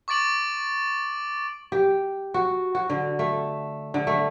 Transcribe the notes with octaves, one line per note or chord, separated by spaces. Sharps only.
C#6 D6 A6 D7 F#7
G4
F#4
F#4
D3
A3
D3
A3